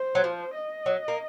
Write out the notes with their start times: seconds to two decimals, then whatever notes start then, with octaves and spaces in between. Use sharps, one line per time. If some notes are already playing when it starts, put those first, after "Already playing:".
Already playing: C5
0.15 F#3
0.24 F3
0.54 D#5
0.86 F#3
1.08 A#3